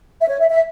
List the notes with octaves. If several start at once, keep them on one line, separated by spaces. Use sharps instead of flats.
E5
C#5
E5
E5